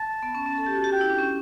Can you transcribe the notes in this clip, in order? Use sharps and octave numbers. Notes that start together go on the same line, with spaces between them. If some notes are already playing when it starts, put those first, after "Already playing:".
Already playing: A5
B3
C#4
C#4
A4
G4
F#4
G4
F#4 G5
E4
D4
C#4